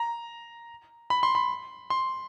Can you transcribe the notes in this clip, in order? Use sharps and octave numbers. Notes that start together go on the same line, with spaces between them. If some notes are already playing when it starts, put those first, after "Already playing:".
Already playing: A#5
B5
C6
B5
C6